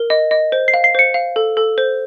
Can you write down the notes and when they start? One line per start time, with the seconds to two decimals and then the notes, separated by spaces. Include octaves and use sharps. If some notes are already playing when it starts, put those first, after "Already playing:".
Already playing: A#4
0.10 D#5
0.31 D#5
0.52 C5
0.68 C7
0.74 F5
0.84 C7
0.95 C5 C#7
1.14 F5
1.36 A4
1.57 A4
1.78 C5